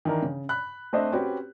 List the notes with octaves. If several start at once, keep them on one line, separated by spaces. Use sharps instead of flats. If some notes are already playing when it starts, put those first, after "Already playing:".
D#3 E3 D4 A#4
C#3
B5 F#6
A3 C4 D4 C5 D#5 E5
C4 C#4 F#4 G4 B4